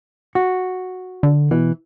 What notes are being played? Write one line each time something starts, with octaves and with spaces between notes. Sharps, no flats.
F#4
D3
B2 E3